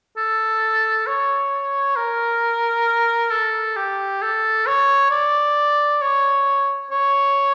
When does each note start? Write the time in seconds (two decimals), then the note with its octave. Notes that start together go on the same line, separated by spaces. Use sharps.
0.17 A4
1.07 C#5
1.96 A#4
3.31 A4
3.76 G4
4.22 A4
4.67 C#5
5.11 D5
6.01 C#5
6.91 C#5